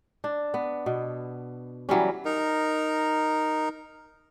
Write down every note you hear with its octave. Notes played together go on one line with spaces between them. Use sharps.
D4
B3
B2
E3 F#3 G3 C#4
D#4 A#4